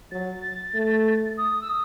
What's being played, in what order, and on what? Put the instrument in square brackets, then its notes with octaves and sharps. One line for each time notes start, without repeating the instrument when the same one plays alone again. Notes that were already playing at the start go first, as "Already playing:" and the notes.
[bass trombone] F#3 [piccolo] A6
[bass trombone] A3
[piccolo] D#6
E6
D#6